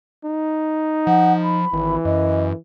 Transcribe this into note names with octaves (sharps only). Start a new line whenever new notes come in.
D#4
F3 F#5
B5
G#1 E3
F#2 D#5